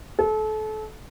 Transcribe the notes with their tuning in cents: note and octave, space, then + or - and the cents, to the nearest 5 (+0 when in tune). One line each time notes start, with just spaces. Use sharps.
A4 -30